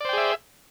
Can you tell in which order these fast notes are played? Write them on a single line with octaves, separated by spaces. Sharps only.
D5 C5 G5 G#4 E5